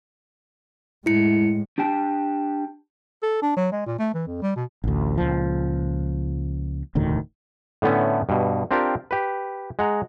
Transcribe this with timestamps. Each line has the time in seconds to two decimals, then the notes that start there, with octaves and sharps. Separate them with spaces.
1.06 A2 G#3 E4 C#7
1.78 D4 G4 G5 A5
3.23 A4
3.42 D4
3.57 F#3
3.72 G#3
3.86 A#2
3.99 A3
4.14 E3
4.27 F2
4.42 G3
4.56 B2
4.84 A1 D2
5.18 C#2 A#2 F3
6.95 E1 D2 A2 D#3
7.82 A2 D3 A3 B3 C#4
8.29 G2 B2
8.71 C4 D4 F4 G4 A#4
9.11 G4 B4
9.79 G#3 F#5 A#5